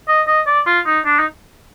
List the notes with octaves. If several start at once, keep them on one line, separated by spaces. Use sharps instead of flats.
D#5
D#5
D5
F4
D#4
D4
D#4